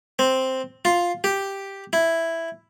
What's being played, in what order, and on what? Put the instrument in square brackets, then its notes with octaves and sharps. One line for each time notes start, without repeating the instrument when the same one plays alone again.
[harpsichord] C4
F4
G4
E4